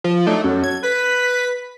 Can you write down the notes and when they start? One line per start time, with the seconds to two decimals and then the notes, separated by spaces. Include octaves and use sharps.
0.04 F3
0.27 F#3 A3 D4 D#4
0.44 F#2 C#4 F#4 A4
0.64 G#6
0.83 B4 B6